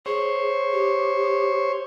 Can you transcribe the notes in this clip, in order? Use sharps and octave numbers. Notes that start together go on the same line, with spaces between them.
G#4 C5 C#5
G4